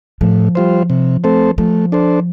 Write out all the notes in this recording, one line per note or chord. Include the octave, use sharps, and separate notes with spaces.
A2 F3
G3 F4 C5
C3
A3 C4 A4 C5
F3 A3
D4 A4 C5